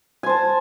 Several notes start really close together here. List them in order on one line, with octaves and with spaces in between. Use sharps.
G#5 C5 A5